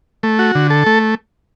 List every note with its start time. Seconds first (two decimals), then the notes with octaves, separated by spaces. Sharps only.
0.23 A3
0.39 F#4
0.55 D3
0.70 A4
0.86 A3